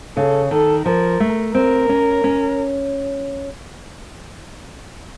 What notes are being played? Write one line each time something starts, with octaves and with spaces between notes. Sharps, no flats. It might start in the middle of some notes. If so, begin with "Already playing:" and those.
C#3 A4
D#3 A4
F3 A#4
A3
C4 A#4
C#4
C#4